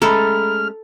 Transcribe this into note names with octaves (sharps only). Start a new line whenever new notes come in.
G#3 A3 C#4 A4 A#5 B5 F6